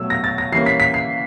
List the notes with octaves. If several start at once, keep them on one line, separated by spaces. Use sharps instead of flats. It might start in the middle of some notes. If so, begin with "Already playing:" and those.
Already playing: B2 F#3 A3 E6
A#6
A6
A#6
E3 G3 A#3 C#4 C7
B6
B6
C7